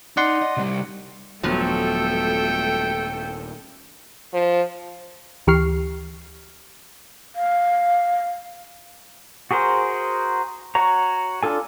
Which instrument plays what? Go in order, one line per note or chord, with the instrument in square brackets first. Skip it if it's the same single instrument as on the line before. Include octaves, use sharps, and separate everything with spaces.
[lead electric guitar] D#4 [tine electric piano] D5 F#5 C6
[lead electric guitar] D#5
C3 G3
[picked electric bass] D#1 B3 [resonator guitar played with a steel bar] G2 F3 F#3 [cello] A3 A4 [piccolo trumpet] G5
[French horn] F3
[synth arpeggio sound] D2 E3 G4 C#6 F6 C7
[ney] F5
[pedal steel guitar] F#4 G#4 A#4 C5
F#4 C#5 A#5
D4 F4 A4 G#5